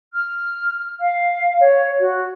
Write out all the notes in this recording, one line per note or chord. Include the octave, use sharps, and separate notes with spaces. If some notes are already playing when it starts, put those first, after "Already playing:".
F6
F5
C#5
F#4